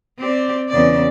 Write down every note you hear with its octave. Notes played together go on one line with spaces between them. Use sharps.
C4 G4 D5
E2 C#3 D5